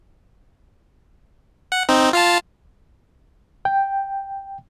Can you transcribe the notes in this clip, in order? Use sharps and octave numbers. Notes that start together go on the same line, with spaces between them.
F#5
C4 D#4
F4 F5 A5
G5